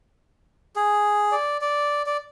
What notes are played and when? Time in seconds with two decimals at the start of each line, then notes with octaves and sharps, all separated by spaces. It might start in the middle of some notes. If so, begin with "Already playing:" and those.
0.76 G#4
1.32 D5
1.61 D5
2.06 D5